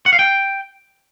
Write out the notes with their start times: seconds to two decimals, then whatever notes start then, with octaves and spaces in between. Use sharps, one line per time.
0.06 F#5
0.13 F5
0.19 G5